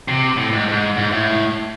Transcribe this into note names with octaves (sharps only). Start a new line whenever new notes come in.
C3
A2
G#2
G#2
G#2
A2